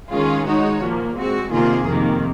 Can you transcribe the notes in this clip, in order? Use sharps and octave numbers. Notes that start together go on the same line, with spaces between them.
D#3 G#3 C#4 F4 G#4
G#3 D#4 F#4 C#5
A#2 F3 A#3
G#3 C4 F#4
C3 D#3 A#3 F4 G#4
F2 C3 D#3 A#3